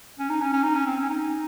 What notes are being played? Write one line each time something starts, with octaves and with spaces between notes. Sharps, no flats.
C#4
D#4
C#4
C#4
D#4
C#4
C4
C#4
D#4